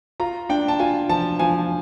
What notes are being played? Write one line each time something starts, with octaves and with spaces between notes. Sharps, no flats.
F4 A#5
D4 G5
A5
F4 G#5
F3 A5
F3 G#5